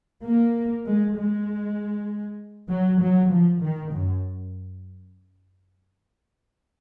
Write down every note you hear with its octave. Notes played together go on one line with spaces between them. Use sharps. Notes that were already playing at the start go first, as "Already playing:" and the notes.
A#3
G#3
G#3
F#3
F#3
F3
D#3
F#2